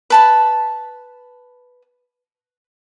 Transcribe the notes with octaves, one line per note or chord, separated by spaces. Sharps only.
B4 A5 B5